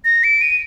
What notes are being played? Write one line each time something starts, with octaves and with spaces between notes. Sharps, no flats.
A#6
D7
D#7